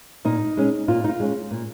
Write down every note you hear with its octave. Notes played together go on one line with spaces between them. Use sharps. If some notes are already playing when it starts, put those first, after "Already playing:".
A#2 D#4
G#3 C#4
A#2 F4
D#4
F4
G#3 C#4
A#2